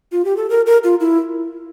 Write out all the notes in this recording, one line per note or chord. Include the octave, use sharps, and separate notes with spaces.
F4
G4
A4
A#4
A#4
F4
E4